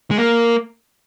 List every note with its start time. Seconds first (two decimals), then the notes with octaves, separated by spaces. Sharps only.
0.11 G#3
0.17 A#3